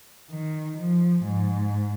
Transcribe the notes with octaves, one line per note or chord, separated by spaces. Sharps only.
D#3
F3
G#2